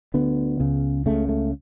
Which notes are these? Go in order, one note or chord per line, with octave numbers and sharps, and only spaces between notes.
D2 D3 B3
C#2 C#3
C#2 C#3 A3
A3